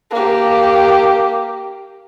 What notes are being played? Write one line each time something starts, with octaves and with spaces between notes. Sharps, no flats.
A#3 G4